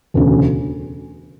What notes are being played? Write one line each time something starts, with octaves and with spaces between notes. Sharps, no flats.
E1 D2 C#3